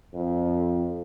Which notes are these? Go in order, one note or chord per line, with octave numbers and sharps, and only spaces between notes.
F2